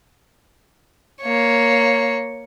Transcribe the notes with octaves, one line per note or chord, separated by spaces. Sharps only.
A#3 C#5